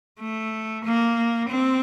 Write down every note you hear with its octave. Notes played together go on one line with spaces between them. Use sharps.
A3
A#3
C4